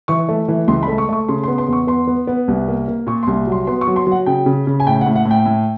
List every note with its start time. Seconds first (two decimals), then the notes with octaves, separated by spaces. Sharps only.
0.08 E3 C#6
0.29 A3
0.48 E3
0.68 C#2 C6
0.83 B5
0.88 A3
0.98 C#6
1.09 A3 C#6
1.28 C#3 C6
1.43 C6
1.48 B3
1.58 C6
1.68 E2 C#6
1.87 B3 C6
2.07 B3
2.27 B3
2.48 C2
2.68 A#3
2.88 A#3
3.07 A#2 C#6
3.23 C6
3.27 C2
3.47 F#3 C6
3.67 B3 C6
3.81 C#6
3.87 F#3
3.96 C6
4.07 F#3 F#5
4.26 C#3 G5
4.46 C#3
4.67 C#3
4.80 G#5
4.87 A2 G5
5.01 F#5
5.06 A2
5.16 F#5
5.26 A2
5.31 G5
5.46 A2